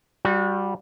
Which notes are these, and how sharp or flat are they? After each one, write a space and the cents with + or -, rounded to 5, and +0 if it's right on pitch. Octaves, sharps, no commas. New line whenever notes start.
G3 +0 F#4 -35